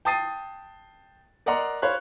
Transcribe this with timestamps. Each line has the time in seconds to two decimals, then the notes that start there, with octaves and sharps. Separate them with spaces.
0.05 G5 A5 D#6 A6 C7 D#7
1.46 A#4 D5 D#5 F#5 A#5 C6
1.82 C5 C#5 F5 B5 F#6